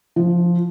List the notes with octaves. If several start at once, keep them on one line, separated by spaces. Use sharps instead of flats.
F3